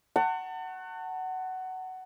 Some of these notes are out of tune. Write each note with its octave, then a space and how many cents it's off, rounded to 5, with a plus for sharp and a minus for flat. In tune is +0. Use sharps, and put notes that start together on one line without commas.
F#5 +15 A5 +40 C#6 -25